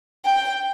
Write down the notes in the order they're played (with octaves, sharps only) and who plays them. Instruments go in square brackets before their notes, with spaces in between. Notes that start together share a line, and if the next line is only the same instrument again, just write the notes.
[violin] G5